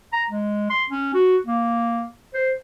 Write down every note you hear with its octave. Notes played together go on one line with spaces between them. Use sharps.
A#5
G#3
C6
C#4
F#4
A#3
C5